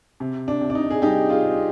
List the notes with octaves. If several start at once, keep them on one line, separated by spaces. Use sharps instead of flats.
C3
D4
C3
D4
D#4
G#4
G3 D#4 G4
F4 G#4
C4